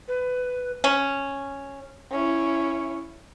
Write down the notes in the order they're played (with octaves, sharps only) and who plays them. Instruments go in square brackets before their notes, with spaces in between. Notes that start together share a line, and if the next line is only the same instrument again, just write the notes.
[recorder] B4
[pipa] C#4
[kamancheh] C#4 E4